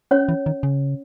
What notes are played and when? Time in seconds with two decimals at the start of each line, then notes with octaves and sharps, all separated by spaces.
0.11 C#4 C#5
0.29 E3
0.46 D#3
0.63 C#3